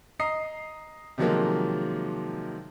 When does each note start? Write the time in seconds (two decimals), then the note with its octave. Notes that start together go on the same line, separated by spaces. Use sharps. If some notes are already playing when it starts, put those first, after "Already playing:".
0.20 D#5 A#5 D#6 C7
1.18 C3 D#3 F3 F#3 G#3 A#3